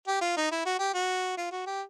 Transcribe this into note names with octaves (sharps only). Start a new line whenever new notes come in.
G4
F4
D#4
E4
F#4
G4
F#4
F4
F#4
G4